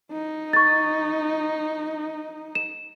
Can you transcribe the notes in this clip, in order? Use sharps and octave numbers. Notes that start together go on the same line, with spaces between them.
D#4
C#6 A6
E7